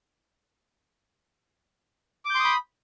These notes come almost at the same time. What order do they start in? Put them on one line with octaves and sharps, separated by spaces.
D6 G6 C6 D#6 B5